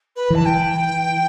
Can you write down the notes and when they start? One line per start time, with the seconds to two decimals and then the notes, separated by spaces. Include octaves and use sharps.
0.16 B4
0.30 E3 A5
0.45 G5